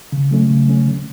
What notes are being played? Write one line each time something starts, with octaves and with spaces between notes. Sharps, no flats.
C#3
F#3 A3 C#4
C#3
F#3 A3 C#4
D3